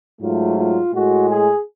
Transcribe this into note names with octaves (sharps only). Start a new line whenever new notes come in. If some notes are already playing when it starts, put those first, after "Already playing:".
G#2 F#3 A3 F4
F4
A2 G#3 F#4
G#4